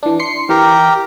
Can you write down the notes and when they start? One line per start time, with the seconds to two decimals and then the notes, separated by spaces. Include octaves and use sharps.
0.03 E3 D4
0.20 C6 C7 C#7
0.49 E3 G4 A#4